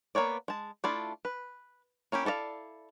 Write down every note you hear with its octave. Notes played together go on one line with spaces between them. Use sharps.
A#3 B3 C#5 D5
G#3 A5
A3 D4 E4 F4 D5
B4
A#3 C#4 E4 G4
E4 A4 D5 D#5 F5